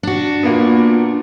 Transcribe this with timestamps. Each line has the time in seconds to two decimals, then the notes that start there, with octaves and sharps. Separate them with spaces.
0.03 D4 F#4
0.43 A#2 A#3 B3